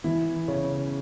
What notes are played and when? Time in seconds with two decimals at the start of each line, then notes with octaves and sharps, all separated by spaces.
0.04 E3 E4
0.48 C#3 C#4